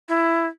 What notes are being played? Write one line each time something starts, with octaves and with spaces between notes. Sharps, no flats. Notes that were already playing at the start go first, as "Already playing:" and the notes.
E4